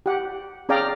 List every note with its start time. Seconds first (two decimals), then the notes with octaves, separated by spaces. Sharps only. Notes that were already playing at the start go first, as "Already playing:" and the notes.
0.06 G4 F#5
0.69 C#4 G#4 D5 F5 G5 A#5